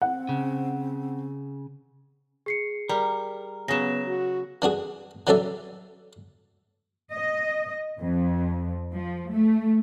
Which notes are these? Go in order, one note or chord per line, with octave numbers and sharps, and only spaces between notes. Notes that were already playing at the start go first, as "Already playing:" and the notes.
C4 F#5
C#3
G#4 C7 C#7
G3 A#4
C#3 F#3 B3 A#6 E7
F#4
E3 D4 F#4 G#4
E3 F#3 C#4 A4 D5 E5
D#5
F2
F3
A3